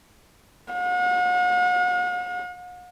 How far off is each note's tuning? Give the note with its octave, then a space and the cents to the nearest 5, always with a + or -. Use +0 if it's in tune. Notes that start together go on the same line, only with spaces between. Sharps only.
F#5 -45